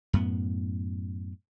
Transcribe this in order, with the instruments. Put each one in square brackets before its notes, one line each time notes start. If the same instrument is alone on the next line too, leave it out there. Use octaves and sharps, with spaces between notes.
[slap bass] F#2 A2 B3